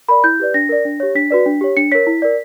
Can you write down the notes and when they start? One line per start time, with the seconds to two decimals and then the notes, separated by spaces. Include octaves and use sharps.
0.09 A#4 D5 B5
0.24 E4 G6
0.39 G4 B4 D5
0.54 D4 A#6
0.69 A#4 D5
0.85 D4
1.00 G4 C#5
1.15 D4 B6
1.30 F#4 B4 D5
1.46 D4
1.61 G4 C#5
1.77 D4 C#7
1.92 A#4 C#5 B6
2.07 E4
2.22 A#4 D5